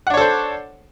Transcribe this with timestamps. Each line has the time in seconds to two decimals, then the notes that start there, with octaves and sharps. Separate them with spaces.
0.07 F#5
0.10 D4
0.14 C#5
0.17 A4
0.21 C5